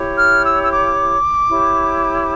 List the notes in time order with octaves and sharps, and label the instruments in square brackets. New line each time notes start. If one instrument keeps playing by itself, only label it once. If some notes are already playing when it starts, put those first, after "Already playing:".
Already playing: [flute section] E4 G4 C#5
F6
E6
E6
D6
E4 G4 C#5